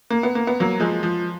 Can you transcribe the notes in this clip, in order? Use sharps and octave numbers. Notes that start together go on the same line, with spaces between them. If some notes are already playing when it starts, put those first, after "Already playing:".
A#3
B3
A#3
B3
F#3 A#3
F3 G#3
F3